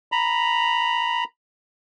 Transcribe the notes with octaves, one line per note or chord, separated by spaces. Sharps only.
A#5 B5